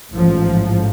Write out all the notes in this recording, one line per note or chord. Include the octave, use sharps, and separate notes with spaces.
A1 G#2 F3